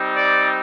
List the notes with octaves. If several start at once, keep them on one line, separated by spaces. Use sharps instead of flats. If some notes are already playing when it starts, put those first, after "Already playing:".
Already playing: G3 C4 D#4
D5